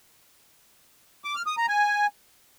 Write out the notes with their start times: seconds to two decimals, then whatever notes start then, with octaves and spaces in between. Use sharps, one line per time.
1.24 D6
1.35 F6
1.46 D#6
1.57 A#5
1.68 G#5